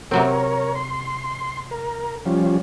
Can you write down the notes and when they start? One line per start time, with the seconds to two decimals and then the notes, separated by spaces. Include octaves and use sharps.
0.11 C3 F#3 C4 A#4 C#5
0.75 C6
1.71 A#4
2.26 F3 G3 C#4